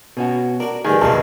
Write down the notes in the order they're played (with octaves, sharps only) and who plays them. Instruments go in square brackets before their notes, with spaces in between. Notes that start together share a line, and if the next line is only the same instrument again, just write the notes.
[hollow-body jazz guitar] B2 C#4 F#4
[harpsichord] D4 F#4 [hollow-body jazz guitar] A#4
[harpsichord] A1 G2 D3 [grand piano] D#3 G#5 [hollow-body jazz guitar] G#4
[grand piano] F1 B1 A5 [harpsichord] E3 F3 A#3